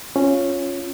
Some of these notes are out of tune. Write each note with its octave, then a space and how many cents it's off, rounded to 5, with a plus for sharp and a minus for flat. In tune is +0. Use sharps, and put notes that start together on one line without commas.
C#4 -5 F4 +0